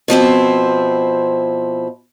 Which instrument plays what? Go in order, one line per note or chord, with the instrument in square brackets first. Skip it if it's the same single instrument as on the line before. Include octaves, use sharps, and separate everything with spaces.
[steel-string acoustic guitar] B2 F3 C4 E4